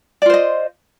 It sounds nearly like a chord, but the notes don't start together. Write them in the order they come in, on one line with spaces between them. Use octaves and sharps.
D5 F4 C5 D#5